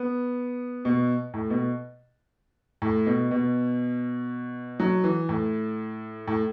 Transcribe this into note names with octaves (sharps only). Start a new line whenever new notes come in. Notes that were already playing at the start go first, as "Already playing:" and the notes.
Already playing: B3
B2
A2
B2
A2
B2
B2
F#3
E3
A2
A2